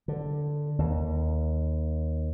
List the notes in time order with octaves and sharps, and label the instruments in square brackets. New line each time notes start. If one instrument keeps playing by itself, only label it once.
[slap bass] D3
D#2